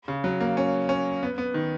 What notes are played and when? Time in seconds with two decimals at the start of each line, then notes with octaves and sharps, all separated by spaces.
0.08 C#3
0.24 F#3
0.40 A#3
0.57 C#4
0.89 C#4
1.23 B3
1.38 B3
1.54 D#3